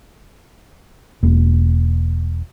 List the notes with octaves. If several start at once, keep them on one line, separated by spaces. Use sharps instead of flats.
E1 A#3